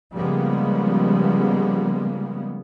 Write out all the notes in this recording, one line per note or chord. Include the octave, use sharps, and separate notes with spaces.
C#3 F3 G3 G#3 A#3 B3